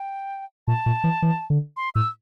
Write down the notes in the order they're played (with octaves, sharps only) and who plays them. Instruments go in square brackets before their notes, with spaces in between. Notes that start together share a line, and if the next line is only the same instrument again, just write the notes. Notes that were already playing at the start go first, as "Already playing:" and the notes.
Already playing: [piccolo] G5
[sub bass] A#2 [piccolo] A5
[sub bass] A#2
E3
E3
D3
[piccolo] C6
[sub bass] A2 [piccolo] E6